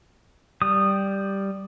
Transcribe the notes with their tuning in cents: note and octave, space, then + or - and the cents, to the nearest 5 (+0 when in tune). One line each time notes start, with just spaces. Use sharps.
G3 +0 D#6 -20